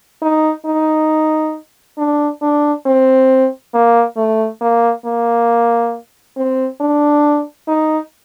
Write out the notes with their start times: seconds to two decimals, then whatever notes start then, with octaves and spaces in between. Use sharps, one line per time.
0.22 D#4
0.66 D#4
1.98 D4
2.42 D4
2.86 C4
3.74 A#3
4.17 A3
4.62 A#3
5.05 A#3
6.37 C4
6.81 D4
7.68 D#4